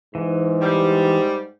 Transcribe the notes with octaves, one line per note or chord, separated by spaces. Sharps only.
G#2 E3
G3